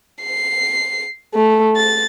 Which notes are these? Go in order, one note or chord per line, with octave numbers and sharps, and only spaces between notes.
C7
A3
A6